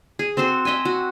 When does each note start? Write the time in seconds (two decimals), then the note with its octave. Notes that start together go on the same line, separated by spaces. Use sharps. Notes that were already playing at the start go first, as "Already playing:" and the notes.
0.19 G#4
0.37 C4 F#4 A4 C5
0.65 D#5 E5 G5 G#5
0.85 F#4